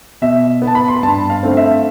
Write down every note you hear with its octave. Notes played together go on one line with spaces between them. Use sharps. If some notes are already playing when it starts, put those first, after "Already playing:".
B2 E5
B3
A5
B5
C6
B5
G2 A5
F5
D3 A3 C4
F5
E5